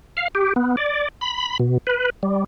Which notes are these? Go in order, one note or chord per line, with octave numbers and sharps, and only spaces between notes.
F5
G4
B3
D5
B5
B2
B4
G3